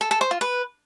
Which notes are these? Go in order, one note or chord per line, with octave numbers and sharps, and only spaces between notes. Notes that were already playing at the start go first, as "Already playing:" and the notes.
A4
A4
C5
F4
B4